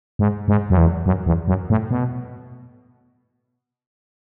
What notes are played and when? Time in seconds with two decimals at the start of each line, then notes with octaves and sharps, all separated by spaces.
0.19 G#2
0.48 G#2
0.70 F#2
0.77 E2
1.06 F#2
1.26 E2
1.48 F#2
1.70 A2
1.91 B2